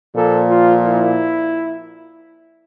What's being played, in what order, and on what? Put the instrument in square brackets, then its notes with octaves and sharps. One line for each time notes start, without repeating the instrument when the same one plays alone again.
[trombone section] A#2 F3 A#3 A4
F4
E4